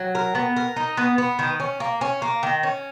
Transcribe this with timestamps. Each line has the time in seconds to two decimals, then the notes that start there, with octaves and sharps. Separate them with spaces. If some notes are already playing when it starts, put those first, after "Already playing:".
Already playing: F#3
0.15 A#4
0.35 B3
0.56 A#4
0.76 D#4
0.97 B3
1.18 B3
1.39 D#3
1.60 C#4
1.80 A#3
2.01 C#4
2.22 A#3
2.43 D#3
2.63 C#4